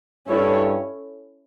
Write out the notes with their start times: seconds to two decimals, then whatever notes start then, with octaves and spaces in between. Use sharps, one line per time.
0.29 G2 C#4 E4 A4 C#5